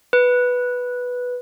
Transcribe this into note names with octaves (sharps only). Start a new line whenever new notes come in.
B4